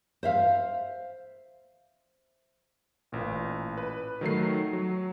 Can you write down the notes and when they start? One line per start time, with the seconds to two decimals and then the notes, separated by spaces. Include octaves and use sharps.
0.23 C5 E5 F5
3.12 A1 A#2
3.77 B4
4.21 D#3 F#3 A3 C7
4.73 F#3